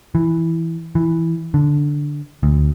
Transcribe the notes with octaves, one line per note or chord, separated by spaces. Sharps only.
E3
E3
D3
D2